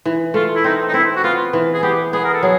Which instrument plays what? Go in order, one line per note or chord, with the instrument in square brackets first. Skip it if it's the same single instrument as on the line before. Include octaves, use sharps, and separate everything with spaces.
[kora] E3
[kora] A3 [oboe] F4
[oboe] E4
[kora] C4 [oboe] D#4
[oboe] D#4
[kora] C4 [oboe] E4
[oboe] F#4
[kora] B3 [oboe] F4
[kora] E3
[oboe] G#4
[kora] B3 [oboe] G4
[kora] B3 [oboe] G#4
[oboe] A#4
A4
[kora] F#3 [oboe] G#4